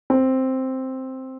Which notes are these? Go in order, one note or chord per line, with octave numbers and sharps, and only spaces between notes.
C4